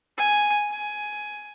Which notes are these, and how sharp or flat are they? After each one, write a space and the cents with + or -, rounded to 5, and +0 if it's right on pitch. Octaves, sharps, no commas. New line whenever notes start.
G#5 +0
G#5 +10